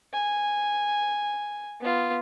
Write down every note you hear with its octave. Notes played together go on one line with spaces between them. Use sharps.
G#5
B3 F4